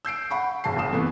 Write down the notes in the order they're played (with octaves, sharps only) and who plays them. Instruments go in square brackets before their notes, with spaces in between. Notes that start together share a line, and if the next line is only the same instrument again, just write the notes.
[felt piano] E6 G6 C7 D7
F#5 B5 C#6
F#1 A5 C7
F#1 A#2 D#6 E7
C3 E3 A3 B3